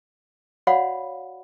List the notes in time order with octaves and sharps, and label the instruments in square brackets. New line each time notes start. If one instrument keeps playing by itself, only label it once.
[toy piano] F#4 C#5 D5 F5 F#5 B5